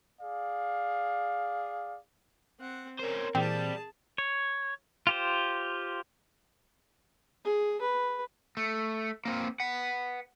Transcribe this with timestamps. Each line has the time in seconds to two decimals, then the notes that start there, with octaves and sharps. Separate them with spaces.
0.22 G#4 D5 F5
2.60 C4 F#5
2.99 C#4 A#4 C5
3.35 A#2 E3 G3 C4 G#4 A5
4.18 C#5
5.07 F4 G4 C5
7.45 G#4
7.81 B4
8.57 A3
9.25 A#3 C4
9.60 B4 F#5